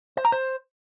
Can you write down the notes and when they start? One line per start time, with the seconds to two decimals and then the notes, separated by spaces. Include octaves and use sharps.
0.17 C5
0.25 A#5
0.32 C5